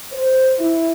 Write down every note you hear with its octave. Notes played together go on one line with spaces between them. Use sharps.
C5
E4